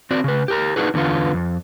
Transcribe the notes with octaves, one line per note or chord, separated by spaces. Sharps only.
C4 F#4 D5
C#3 B4
G4 A#4 A#5
D4 D#4 F#4 G#4 B4
E2 D3 A#3 B3 F4
F2